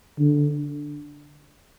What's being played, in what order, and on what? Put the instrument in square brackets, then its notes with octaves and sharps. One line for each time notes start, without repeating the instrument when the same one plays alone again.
[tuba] D3